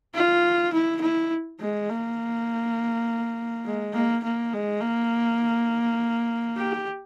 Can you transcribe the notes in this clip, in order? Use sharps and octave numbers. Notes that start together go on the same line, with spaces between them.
F4
E4
E4
G#3
A#3
G#3
A#3
A#3
G#3
A#3
G4